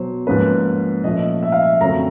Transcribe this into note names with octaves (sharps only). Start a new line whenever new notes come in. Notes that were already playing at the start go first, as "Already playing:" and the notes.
Already playing: B2 F#3 B3 C5
G#2 F3 A#3 C#4 B4
A#2 F3 A3 C#4 D#5
E5
F5
E5
F#2 D3 F#3 A3 C4 A#5